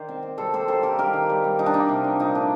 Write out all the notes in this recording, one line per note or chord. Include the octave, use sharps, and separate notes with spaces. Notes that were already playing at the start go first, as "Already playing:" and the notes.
Already playing: D#3 A#4 C5 D5
C4
C4
G3 A4 C5
A#3 A4 C5
G3 A4 C5
A#3 G4 A#4
D#3 G4 A#4
D#3
G3
G3
F3 D#4
D4
A#3 D#4
C3
D4
A#2 D#4
A3 D4